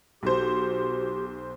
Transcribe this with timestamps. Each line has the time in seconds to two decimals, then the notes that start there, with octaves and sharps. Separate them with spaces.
0.23 B1 F#4 G4 C5